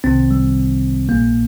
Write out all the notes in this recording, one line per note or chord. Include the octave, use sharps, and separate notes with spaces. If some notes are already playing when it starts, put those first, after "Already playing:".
C2 C3 D#3 C4
G3
A#1 A#2 A#3